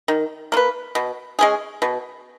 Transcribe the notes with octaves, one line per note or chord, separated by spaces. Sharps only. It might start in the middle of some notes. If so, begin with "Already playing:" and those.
D#3
A#3 F4 B4
B2
G#3 C#4 G#4
B2